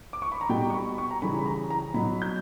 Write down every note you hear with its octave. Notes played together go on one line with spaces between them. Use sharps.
D6
C#6
B5
A#5
B2 G3 G5
C#6
B5
C#6
A#5
C#3 E3 G3 B5
B5
A#5
A#5
B2 F#3 B5
G6